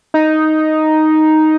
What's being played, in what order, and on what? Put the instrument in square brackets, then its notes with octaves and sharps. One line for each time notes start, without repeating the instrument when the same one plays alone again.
[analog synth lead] D#4